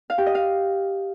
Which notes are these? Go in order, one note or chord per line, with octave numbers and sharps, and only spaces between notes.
F5
G4
D#5
F5